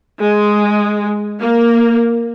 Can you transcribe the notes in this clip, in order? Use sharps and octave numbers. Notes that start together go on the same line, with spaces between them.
G#3
A#3